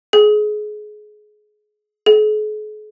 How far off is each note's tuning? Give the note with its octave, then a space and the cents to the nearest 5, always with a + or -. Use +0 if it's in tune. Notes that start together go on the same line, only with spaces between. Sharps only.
G#4 +25
G#4 +45